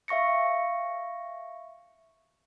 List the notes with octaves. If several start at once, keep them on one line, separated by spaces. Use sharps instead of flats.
E5 F5 C#6 A#6 C#7